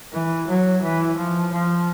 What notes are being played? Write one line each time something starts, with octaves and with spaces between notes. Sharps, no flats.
E3
F#3
E3
F3
F3